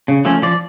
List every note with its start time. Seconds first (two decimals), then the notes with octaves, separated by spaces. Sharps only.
0.08 C#3
0.25 F3 A3 C#4
0.42 F3 D5